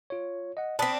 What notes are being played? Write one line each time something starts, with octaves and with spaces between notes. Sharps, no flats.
F4 C#5
D#5 F#5
C4 D4 B5 D#6 B6